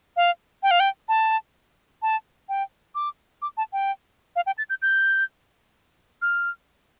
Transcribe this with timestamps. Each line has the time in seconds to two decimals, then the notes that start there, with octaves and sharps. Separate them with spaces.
0.17 F5
0.63 G5
0.71 F5
0.80 G5
1.09 A5
2.02 A5
2.49 G5
2.95 D6
3.42 D6
3.57 A5
3.73 G5
4.36 F5
4.46 G5
4.58 A6
4.70 G6
4.82 G6
6.22 F6